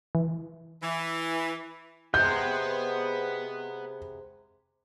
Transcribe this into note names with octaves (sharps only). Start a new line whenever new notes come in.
E3
E3
C3 G#3 B4 F#5 G6